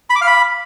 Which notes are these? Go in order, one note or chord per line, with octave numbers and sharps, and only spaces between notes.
B5
D6
F5
B5